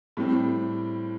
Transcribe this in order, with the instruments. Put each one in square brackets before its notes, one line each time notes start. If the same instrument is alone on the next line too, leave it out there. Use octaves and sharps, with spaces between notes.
[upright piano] A2 G3 C4